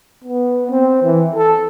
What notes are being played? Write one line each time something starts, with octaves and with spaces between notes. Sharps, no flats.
B3
C4
E3
A4